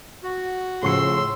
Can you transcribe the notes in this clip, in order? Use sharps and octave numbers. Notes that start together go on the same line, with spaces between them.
F#4
A2 C#3 F3 C6 C#6 E6 C7